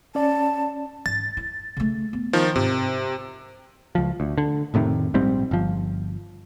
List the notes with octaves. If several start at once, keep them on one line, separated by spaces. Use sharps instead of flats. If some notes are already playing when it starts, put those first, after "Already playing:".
C#4 D5 A5
G#2 E3 A6
E4
C#3 A3
B3
D#3 F3
G#2 C3
C#2 F3
D2
D3
F1 A2 C3 D#3
A#1 G#2 G3 C4
G1 F3